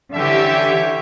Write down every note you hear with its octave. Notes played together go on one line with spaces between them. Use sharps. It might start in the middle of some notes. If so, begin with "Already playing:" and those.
D3 E3 G3 C#4 G4 E5